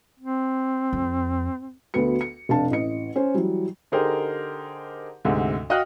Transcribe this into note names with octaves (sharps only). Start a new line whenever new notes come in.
C4
F2
D2 B3 F#4 B4 C#7
C#7
F1 D4 F5 A5
A1 D#5 C#7
C#4 C5
E3 F#3 G3
D3 D#4 G4 G#4 A#4 C5
D2 G#2 C3
F#4 D#5 F5 G5 F6 F#6